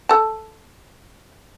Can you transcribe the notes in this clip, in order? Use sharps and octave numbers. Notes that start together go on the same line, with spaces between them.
A4 A5